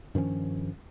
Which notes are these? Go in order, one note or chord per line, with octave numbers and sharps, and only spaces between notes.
G2 D#3 F3 C#4